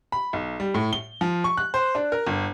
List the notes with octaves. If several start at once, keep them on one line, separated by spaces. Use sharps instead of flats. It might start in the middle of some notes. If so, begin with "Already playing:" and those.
B5
B1
G3
A2
G7
F3
C#6
F#6
C5
D4
A#4
G1